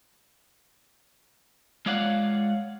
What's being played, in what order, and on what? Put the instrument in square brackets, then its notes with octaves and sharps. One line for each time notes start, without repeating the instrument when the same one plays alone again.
[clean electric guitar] G#3 F4 C#5 D5 F5 F#5